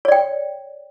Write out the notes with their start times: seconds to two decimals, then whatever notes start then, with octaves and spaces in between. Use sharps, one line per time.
0.05 C#5
0.08 D5
0.12 G5